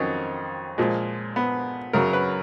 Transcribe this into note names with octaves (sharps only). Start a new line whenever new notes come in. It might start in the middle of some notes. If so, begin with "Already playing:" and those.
Already playing: F2 D#3 F#3 C#4 D#4
A#2 F3 G#3
B3
F#2 C#3 F#3 A#4
B4